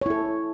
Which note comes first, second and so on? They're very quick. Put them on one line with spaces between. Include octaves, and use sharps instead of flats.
C#5 E4 A4